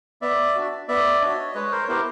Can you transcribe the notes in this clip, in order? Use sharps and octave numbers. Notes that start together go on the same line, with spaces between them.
B3 D5 E5
D4 F#4
B3 D5 E5
D4 F#4 C#5 D#5
G#3 B4 C#5
A#4 C5
C#5
B3 E4 G4 A#4 C5